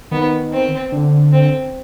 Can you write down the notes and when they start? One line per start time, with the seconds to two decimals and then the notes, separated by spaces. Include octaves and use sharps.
0.11 D#3 B3
0.53 C4
0.92 D3
1.33 C4